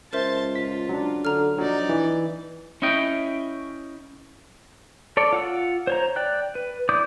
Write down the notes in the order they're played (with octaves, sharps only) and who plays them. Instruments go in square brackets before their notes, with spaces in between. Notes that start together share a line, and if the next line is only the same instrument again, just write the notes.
[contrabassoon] C#2 [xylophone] A#4 C5 E5 [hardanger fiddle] A5 C6
[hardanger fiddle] F4 [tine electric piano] B6
[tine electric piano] F#3 D4
[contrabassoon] D3 [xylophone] A#5 F6
[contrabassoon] A#1 [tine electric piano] F#3 [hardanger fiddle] D#4 D5
[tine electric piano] E3
[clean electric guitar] C#4 E4 D#5 G5
[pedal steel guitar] A4 C#5 D5
F4 F#5 E6
C5 C#5 A#5
D5 G5 F#6
B4
E4 D5 D6 D#6 G6